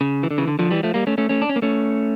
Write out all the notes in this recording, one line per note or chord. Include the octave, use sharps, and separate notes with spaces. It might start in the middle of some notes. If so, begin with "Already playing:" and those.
C#3
E3
D3
C#3 E3
D3
D3 F3
E3 G3
F3 A3
G3 A#3
A3 C#4
A3 C#4
A3 C#4
D4
C#4
A#3
A3 C#4